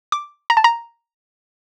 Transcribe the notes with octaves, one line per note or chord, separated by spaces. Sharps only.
D6
A#5
A5
A#5